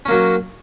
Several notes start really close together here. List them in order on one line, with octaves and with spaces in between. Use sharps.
C#4 A#3 F#3